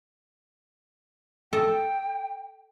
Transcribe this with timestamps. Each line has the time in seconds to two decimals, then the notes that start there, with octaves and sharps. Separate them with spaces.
1.53 A4 D#5 G5